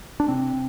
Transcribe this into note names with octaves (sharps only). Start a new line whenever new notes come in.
D4
C3 C4